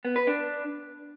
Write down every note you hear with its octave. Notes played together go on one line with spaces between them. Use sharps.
B3
B4
D4